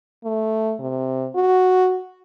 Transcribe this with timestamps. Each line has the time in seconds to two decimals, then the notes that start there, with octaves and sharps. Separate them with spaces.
0.24 A3
0.80 C3
1.36 F#4